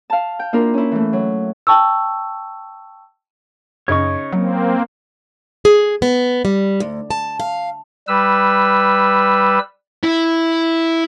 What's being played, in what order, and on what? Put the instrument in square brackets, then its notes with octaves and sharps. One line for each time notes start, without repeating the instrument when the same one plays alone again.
[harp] F5 A5
G5
A#3 D4 E4 F4 A#4
C#4 E4
E3 A3
F#3
[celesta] G5 A5 C#6 E6
[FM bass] F#2 [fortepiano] C#3 D#4 [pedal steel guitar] C#5 C#6
[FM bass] F#3 [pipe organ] A#3 C4
[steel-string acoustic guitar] G#4
B3
G3
D2
A5
F5
[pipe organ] G3 B4 E6
[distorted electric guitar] E4